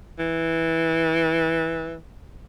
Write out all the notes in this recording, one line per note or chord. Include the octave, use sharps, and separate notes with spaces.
E3